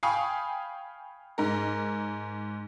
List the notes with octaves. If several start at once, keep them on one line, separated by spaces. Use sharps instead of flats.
F5 G5 G#5 B5 C#6 D#6
G#2 A#4